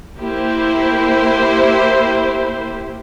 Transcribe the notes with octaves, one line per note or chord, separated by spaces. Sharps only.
A#3 E4 G4 C5